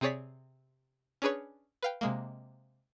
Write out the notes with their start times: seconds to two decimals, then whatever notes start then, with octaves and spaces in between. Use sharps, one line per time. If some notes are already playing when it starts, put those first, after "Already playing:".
0.01 C3 C4 G#4 C#5 D5 B6
1.22 C#4 D4 G#4 B4 C#5
1.83 B4 F5 G5
2.01 C3 G#3 A#3